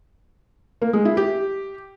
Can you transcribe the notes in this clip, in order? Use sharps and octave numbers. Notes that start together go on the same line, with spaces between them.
A#3
G#3
E4
G4